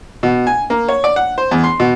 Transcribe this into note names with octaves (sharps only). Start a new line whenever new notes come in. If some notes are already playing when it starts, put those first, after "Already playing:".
B2
G#5
A#3
C#5
D5
F#5
C5
E2
C6
B2